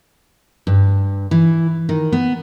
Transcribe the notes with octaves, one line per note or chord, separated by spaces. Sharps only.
G2
E3
D#3
B3